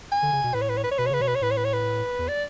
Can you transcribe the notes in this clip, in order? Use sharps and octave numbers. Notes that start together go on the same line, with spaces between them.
G#5
D3
C#3
B2
A2 B4
C#5
B4
C#5
B4
C#5
B2 B4
C#5
C#3 B4
B2 C#5
B4
C#5
A2 B4
C#5
B4
C#5
B4
E2
D5